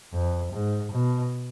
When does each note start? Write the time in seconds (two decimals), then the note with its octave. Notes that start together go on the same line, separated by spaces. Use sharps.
0.13 F2
0.53 G#2
0.92 B2